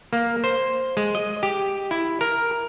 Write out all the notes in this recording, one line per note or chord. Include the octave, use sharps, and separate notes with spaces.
A#3
C5
G#3
D#5
G4
E4
A#4